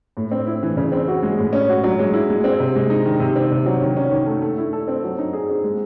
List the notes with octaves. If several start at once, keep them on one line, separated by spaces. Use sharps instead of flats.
A2
C4
E4
E3
C#3
C4
F#4
G#3
A2
C#4
F#4
F#3
G#3
E4
G#3
C4
C3
G#3
D#4
D#3
C3
C4
C3
F#3
D#3
C#4
D#3
A3
A3
E4
A4
C4
F#3
D#4
G#4
C4
G#3